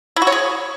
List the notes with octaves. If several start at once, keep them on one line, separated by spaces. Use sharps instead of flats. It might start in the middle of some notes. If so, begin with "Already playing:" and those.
E4
F#4
C#5
G#4